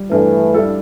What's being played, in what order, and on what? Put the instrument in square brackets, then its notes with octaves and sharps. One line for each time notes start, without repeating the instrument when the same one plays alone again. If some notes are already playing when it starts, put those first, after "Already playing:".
Already playing: [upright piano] G3
[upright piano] G2 [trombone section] E3 A3
[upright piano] G3 E4 A4